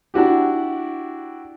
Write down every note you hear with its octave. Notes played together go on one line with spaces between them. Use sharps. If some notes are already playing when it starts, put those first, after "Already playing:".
D4 E4 F#4 G4